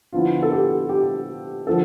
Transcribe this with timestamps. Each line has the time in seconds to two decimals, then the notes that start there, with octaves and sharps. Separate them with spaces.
0.13 D3 F3 B3 E4 F4
0.43 A4
0.52 G4
0.89 G4
1.66 D3 F3 A4